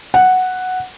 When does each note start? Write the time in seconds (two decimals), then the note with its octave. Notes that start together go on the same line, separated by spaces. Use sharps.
0.14 F#5